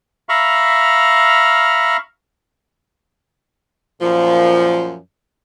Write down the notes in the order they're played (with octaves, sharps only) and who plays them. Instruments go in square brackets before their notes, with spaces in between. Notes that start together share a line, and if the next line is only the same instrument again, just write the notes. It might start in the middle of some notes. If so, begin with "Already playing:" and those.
[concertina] E5 F5 A#5 B5 C#6 F6
[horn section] F#2 A#2 F3